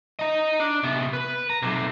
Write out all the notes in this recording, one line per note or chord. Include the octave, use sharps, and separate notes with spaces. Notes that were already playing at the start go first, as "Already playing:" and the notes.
D#5 A#5
D4
C3 B3
B4
A#5
B1 C3